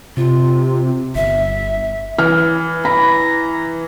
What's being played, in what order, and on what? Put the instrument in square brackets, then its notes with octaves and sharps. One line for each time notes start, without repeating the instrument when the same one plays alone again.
[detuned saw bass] C3 [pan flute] F4
[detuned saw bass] G1 [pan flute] E5
[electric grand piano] E3 [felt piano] F6
[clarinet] A#5 [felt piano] B5